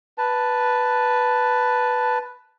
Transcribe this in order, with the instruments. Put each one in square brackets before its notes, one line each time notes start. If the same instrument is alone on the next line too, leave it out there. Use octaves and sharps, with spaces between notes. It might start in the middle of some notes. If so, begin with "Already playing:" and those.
[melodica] B4 A5